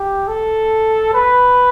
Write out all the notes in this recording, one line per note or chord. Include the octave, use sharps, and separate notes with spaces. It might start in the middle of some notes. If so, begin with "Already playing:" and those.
Already playing: G4
A4
B4